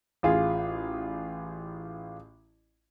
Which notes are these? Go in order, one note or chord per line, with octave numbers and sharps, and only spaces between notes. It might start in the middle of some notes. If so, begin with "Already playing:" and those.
A1 F4 G#4